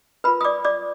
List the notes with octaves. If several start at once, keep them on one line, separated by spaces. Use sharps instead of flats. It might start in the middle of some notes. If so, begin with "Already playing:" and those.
F4 A#4 B4 B5
D#6
D5 D6
D5 D6